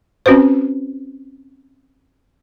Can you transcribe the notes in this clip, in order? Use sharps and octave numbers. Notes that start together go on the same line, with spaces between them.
C4 C#4 F#4 B4 C5